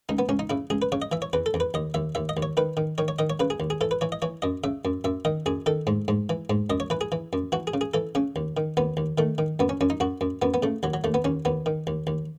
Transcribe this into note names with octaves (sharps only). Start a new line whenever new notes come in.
C#2 D#4
B3
C#2 C#4
D#4
C#3 E4
C#2 G#4
B4
C#3 C#5
D#5
E3 E5
C#5
E2 B4
A4
E2
B4
D#2 D#5
D#2 E5
D#2 E5
D#5
D#2
C#5
D#3 B4
D#3
D#3 C#5
C#5
D#3 D#5
C#5
C#3 B4
G#4
D#2
G#4
E3 A4
B4
E3 C#5
D#5
E3 C#5
F#2 D#5
C#3 E5
F#2
F#2 E5
D#3 D#5
F#2 G#4
D#3 A4
G#2
G#2
E3
G#2
F#2 D#5
C#5
E3 B4
G#4
E3
F#2
E3 F#4
G#4
C#3
G#4
E3 A4
C#3 C#4
D#2
D#3
D#2 B3
D#2
D#3 A3
D#3
F#2 B3
C#4
F#2 C#4
D#4
F#2 F#4
F#2
F#2 B3
B3
C#3 A3
D#2 F#3
F#3
D#2 A3
B3
D#2 C#4
D#2 B3
D#3
D#2
D#2